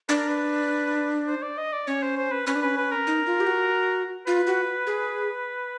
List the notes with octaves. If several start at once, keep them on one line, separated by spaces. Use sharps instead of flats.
D4 B4
A#4
B4
C5
D5
D#5
D5
C#4 C#5
C5
C5
B4
C#4 B4
D4
C#4 B4
B4
A#4
D#4
F4
G4
F#4
F4 B4
F#4
G#4